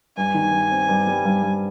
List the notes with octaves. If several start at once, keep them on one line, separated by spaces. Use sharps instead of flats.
G2 G#5
D#3
G2
C4
G2
G3
G2
G2